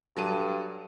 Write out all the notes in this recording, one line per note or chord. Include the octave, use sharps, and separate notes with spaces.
G2 F#3 A4 D#7